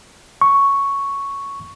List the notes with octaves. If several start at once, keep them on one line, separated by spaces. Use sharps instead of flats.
C#6